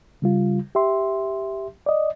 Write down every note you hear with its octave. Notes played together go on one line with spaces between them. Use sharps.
C#3 G3 F4
G4 E5 C6
D5 D#5